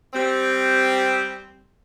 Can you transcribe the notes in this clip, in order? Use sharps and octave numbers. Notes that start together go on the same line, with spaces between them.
G3 C4